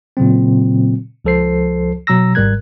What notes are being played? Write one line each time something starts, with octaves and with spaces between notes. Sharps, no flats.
A#2 C#3 F#3 C4
C#2 F3 A4 C5 C7
B2 F#3 A#5 E6 A#6
G#1 G#2 G3 A#4 F#6 G#6